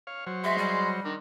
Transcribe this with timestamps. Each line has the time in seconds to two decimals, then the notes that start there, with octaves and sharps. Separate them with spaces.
0.07 C#5 F5
0.27 F#3 C5 C#5
0.44 G#3 E5 C6
0.58 G3
1.05 D#3 D4